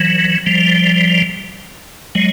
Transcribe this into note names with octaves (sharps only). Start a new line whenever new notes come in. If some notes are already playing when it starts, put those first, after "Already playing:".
Already playing: E3 F#3
F3 G3
F#3 G#3